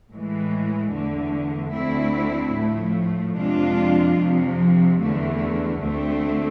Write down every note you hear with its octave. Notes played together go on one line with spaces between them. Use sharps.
A2 E3 G#3
E2 D3 A3
D2 D3 A3 C4 E4
A2 F3 A3
F2 C3 G#3 D4 F4
F2 C3 F3
E2 D3 A3
D2 D3 A3 C4